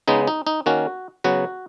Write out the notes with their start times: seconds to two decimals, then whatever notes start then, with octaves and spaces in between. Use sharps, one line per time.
0.08 C#3 G#3 B3 D#4
0.27 D#4
0.47 D#4
0.66 D#3 A#3 C#4 F#4
1.24 C#3 F#3 B3 F#4